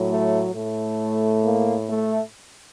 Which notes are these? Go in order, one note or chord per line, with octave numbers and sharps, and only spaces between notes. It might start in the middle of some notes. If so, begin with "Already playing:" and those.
Already playing: A2 F#3
A3
A2 A3
A#3
A3